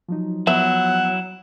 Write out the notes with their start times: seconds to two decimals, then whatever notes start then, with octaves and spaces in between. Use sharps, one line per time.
0.09 F3 F#3 D#4
0.47 F3 F#3 B3 E4 E5 F#5